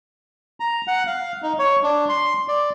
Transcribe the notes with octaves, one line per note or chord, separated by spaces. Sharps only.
A#5
F#5
F5
D#4
C#5
D4
C6
D5